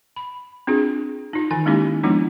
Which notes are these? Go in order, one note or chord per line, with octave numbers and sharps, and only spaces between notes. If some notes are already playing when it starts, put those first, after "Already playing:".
B5
C4 D4 F4 G#4
D#4 F4
D#3 E3 G#5
G#3 A#3 C#4 D#4 E4 G4
F3 G#3 B3 D4 E4 F4